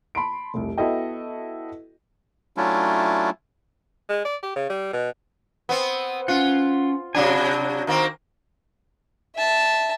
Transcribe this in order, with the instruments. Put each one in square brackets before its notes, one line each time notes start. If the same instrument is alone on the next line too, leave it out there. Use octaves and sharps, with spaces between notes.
[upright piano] A5 B5 C6 D7
F1 C2
B3 E4 F#4 A4 D#5 G5
[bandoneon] F#3 A3 C#4 D4 E4 F4
[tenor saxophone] G#3
D5
G4
C#3
G3
B2
[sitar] B3 C4
[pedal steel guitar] C#4 F#5 [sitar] F4
[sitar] C3 F#3 D4 [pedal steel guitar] G#5 B5
[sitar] D#3 A#3 C4
[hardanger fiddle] E5 A5